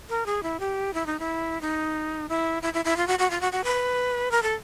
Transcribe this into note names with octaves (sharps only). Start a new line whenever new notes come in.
A#4
G#4
E4
G4
E4
D#4
E4
D#4
E4
E4
E4
E4
F4
F#4
F#4
F4
F#4
F#4
B4
A#4
A4